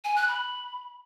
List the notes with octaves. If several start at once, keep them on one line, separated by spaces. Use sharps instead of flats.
G#5
F#6
B5